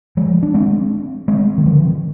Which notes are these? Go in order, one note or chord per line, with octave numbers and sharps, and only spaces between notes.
F3 G#3
D4
G#3 C4
G#3 C4
D#3
D3 F3